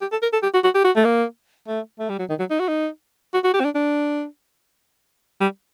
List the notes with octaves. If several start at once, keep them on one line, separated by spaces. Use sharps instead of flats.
G4
A4
A#4
A4
G4
F#4
F#4
G4
F#4
A3
A#3
A3
A3
G3
F#3
D#3
F#3
D#4
F#4
D#4
F#4
F#4
G4
C4
D4
D4
G3